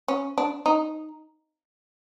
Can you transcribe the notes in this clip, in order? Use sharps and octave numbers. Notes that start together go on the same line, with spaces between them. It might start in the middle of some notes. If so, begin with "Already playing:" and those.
C#4
D4
D#4